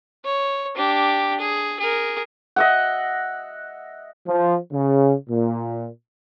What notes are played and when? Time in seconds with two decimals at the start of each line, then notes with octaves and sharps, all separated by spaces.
0.25 C#5
0.76 D4 G4
1.40 G#4
1.80 G#4 A#4
2.56 D#5 E5 F#5
4.26 F3
4.71 C#3
5.28 A#2